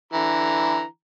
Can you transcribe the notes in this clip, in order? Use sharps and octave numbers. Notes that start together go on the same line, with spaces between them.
D3 E3 A#5